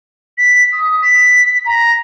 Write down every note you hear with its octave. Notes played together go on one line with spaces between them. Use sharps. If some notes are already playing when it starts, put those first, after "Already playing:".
B6
D#6
B6
A#5